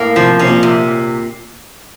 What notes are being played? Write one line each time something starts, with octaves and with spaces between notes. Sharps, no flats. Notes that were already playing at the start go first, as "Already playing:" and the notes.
Already playing: A2 A#3
C3 F3
C3 C#4
A#2
C3